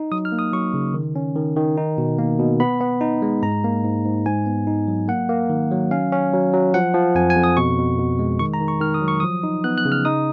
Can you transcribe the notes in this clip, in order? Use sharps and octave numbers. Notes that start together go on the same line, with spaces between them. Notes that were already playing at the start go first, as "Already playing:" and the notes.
Already playing: D#4
F#3 D#6
F6
A#3
D#6
F#3 C#6
C#3
D#3
C#4
D#3
D#3
D#4
B2
A#3
B2
B3 B5
B3
D#4
G#3
G#2 A#5
A#3
G#2
G#2
G#2 G#5
B3
D#4
F#3
A#3 F#5
A#3
D#3
F#3
C#4 F5
C#4
F#3
F#3
F3 F#5
F3
F2 G#5
G#5
F2
D#6
B2 C#6
B2
B2
G#3
D#3 C#6
A#5
D#3
C#6
D#3 F6
D#6
F#3
C#6
F3 D#6
D#4
B3 F#6
F#6
C#3
F6
D#4 D#6